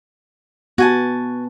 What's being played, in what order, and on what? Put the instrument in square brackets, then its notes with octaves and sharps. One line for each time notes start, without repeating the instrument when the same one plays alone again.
[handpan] B3 [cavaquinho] F#4 G#5 A5